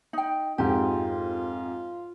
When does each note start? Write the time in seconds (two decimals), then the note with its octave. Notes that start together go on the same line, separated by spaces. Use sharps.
0.13 D#4 G5
0.58 F2 G#2 F4 G4